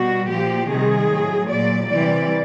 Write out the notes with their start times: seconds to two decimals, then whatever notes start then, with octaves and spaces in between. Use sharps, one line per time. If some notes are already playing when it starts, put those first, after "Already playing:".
Already playing: B2 G3 F#4
0.29 A#2 F3 G4
0.71 C3 D#3 G3 G#4
1.11 A2 F#3
1.50 A#2 F#3 D5
1.90 C3 E3 G3 D5